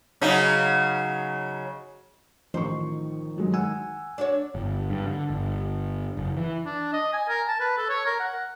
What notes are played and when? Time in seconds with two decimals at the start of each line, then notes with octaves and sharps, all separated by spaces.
0.21 C#3 F#3 D#4
2.54 A1 D#3 F3 C5 C#6
3.36 F#2 F#3 G#3
3.54 F#5 G#5 E6
4.18 D4 F#4 C#5
4.55 G1
4.90 G2
5.07 D3
5.30 G1
6.17 F#1
6.37 E3
6.65 D4
6.93 D#5
7.13 G#5
7.29 A#4
7.48 A5
7.60 B4
7.78 A4
7.89 C#5
8.06 A#4
8.20 F#5